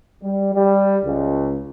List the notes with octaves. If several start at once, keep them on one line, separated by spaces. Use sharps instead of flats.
G3
G3
C#2